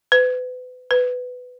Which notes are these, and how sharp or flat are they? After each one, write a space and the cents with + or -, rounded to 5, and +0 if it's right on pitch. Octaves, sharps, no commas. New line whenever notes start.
B4 +35
B4 +15